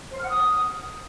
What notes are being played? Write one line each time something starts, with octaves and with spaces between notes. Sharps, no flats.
C5
F6
F#5
D#6